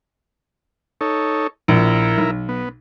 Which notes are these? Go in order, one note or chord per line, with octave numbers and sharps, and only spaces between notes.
D#4 A4 C#5
A#1 E4 A#4
B1
B3